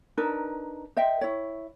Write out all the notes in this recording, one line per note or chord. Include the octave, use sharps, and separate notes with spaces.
D4 D#4 A#4 B4
C5 D#5 E5 G5
E4 C#5